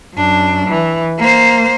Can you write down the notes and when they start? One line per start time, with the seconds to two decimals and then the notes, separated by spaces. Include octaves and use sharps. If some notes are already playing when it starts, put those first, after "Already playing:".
0.15 F#2 D4
0.68 E3
1.18 A#3 C5